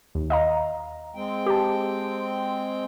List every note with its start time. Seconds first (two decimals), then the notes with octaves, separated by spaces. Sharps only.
0.15 D#2
0.30 D#5 F5 A#5
1.15 G#3 C4 G5
1.46 G4 A5